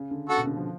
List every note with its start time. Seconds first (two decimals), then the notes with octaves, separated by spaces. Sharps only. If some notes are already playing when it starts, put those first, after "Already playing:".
Already playing: C#3
0.11 D3
0.29 C#3 F#4 A4
0.38 B2
0.47 D3
0.57 F3